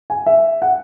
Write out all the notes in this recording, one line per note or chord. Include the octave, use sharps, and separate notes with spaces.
G#5
E5
F#5